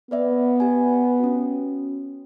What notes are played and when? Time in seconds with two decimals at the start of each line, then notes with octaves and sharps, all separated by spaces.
0.11 B3 B4 D5 E5
0.60 G4 G#5
1.20 C#4 F#4